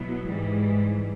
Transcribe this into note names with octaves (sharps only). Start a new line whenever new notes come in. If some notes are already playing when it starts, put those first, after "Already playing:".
Already playing: B2 F#3 B3 E4
G#2 E3 G3